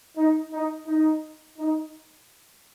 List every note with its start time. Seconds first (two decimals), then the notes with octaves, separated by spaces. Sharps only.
0.17 D#4
0.52 D#4
0.87 D#4
1.58 D#4